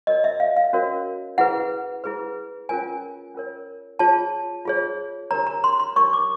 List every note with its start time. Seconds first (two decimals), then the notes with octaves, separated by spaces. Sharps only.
0.07 C#4 F#4 A#4 C#5 D#5
0.24 E5
0.40 F5
0.57 F5
0.73 C#4 F#4 A#4 C#5
1.38 E4 G#4 B4 F#5
2.04 E4 G#4 B4
2.69 C#4 F4 A#4 C#5 G#5
3.35 C#4 F4 A#4 C#5
3.99 F4 G#4 C#5 A5
4.65 F4 G#4 C#5
5.31 D4 G4 A#4 C#5 A#5
5.47 A#5
5.64 C6
5.79 C6
5.96 D4 G4 A#4 C#5 C#6
6.13 D6